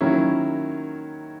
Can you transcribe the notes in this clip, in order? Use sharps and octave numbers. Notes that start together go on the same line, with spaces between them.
D#3 F#3 A#3 C#4 E4